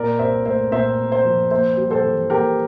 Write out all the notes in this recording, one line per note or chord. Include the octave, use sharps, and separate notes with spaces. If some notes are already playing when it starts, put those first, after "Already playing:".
Already playing: A#2 A#4 D5
C2 C5 E5
A3 C5 E5
A#2 C5 E5
C2
C5 E5
F3
A#3 C5 E5
G3
A4 C5
E3
A#3 G4 A#4